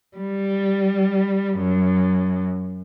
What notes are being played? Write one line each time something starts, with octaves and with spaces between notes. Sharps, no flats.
G3
F#2